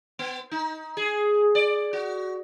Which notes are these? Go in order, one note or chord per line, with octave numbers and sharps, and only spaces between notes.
B3
D#4
G#4
D5
F#4